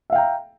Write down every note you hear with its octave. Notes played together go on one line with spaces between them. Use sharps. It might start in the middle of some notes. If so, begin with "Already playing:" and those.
E5 F5 G5 A#5